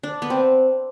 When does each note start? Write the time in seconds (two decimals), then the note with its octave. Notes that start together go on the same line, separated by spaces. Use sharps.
0.03 D4
0.22 B3
0.30 C4